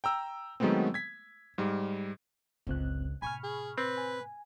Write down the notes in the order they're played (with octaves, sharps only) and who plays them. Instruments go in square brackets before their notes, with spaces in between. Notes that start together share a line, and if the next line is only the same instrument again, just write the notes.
[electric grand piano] G5 A#5 E6
D#3 F#3 G#3 A3 B3 C4
G#6 B6
G#2 G3
[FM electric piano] G1 C4 F#6 [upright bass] C#2
[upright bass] A2 C3 [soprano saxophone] G#5 [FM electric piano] B5 C#6 F6
[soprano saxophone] G#4
[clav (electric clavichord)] C4 [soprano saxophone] B4
[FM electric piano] G#5